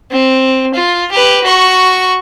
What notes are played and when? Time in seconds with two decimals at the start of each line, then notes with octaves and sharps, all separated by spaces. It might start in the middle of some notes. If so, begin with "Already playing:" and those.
0.11 C4
0.74 F4
1.11 G4 B4
1.43 F#4 C#6